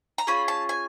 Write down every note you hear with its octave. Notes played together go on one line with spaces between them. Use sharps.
A#5
C#4 F4 G#4 B5
A5
G#5